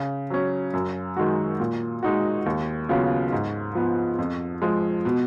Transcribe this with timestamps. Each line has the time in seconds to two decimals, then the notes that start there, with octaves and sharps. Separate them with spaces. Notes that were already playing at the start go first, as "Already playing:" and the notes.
Already playing: C#3
0.30 F#3 C#4
0.73 F#2
1.17 D#3 G#3 D#4 F#4
1.60 A#2
2.03 G#3 D#4 F#4
2.46 D#2
2.89 C#3 F#3 B3 F4
3.32 G#2
3.75 F3 B3
4.19 F2
4.62 F3 G#3
5.05 B2